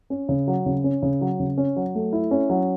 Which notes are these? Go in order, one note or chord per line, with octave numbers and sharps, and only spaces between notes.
C#4
C#3
F#3
C#3
C#4
C#3
F#3
C#3
C#4
F#3
A3
E4
C#4
F#3